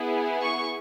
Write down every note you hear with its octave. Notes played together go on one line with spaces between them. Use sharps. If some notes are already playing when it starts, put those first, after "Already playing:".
Already playing: B3 E4 G#4
C#6